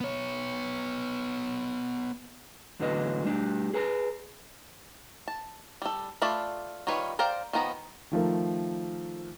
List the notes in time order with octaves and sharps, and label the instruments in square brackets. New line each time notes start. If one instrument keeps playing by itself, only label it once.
[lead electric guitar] B3 C#5
[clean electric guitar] E2 A2 D3 F#3 B4 D#5
G3 A3 D4 G4
G#4 B4 G#5 A#5
[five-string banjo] A5
G3 A4
A3 F4 D5 A5 B5
D#3 G3 F4 B4 C#5
A#4 C5 D5 F5 G5
D#3 F3 B3 A#5
[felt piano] D#3 F3 A3 A#4